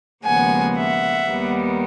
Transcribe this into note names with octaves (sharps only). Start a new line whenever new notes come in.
D#2 C#3 F3 G#3 B3 F#5 G#5
E5 F#5
D#2 D#3 G3 B3